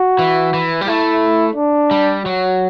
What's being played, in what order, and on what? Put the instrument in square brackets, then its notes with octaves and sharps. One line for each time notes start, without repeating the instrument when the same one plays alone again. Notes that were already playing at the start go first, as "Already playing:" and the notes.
Already playing: [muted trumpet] F#4
[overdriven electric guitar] E3
E3
G3
[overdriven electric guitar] A3 [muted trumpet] E4
[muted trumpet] D4
[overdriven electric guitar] G3
[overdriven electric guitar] F#3 [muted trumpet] F#4